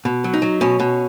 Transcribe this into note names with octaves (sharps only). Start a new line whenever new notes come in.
B2
F#3
D#4
F#3
B2 C#4
B2